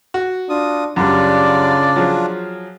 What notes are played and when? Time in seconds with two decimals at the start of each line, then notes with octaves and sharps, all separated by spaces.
0.14 F#4
0.49 D4 F4 D#6
0.96 F#2 C#3 G3 D4 F4 D5
1.96 F3 F#3 G#4